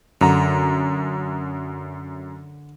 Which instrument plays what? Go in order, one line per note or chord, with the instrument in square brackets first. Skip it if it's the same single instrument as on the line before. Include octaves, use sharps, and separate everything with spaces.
[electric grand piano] F#2 A#5 [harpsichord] D3